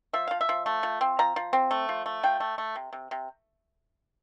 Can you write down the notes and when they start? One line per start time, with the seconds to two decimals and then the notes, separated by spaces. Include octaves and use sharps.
0.13 F3 E5
0.27 F3 F5
0.41 E5
0.49 F3
0.66 A3
0.83 F3
1.01 C4
1.19 F3 A#5
1.36 F3
1.53 C4
1.71 A3
1.89 F3
2.06 A3
2.23 F3 G5
2.40 A3
2.58 A3
2.76 C3
2.93 C3
3.11 C3